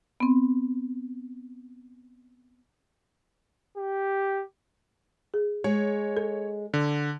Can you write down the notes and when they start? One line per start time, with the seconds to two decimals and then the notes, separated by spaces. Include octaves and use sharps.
0.20 B3 C4
3.77 G4
5.34 G#4
5.64 G#3 C#5
6.17 A4
6.74 D3